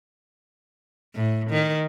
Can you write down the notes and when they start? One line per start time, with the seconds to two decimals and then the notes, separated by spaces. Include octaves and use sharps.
1.15 A2
1.51 D#3